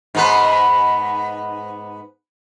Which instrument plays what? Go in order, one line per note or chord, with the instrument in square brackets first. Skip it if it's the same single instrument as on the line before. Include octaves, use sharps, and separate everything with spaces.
[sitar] G#2 B3 B4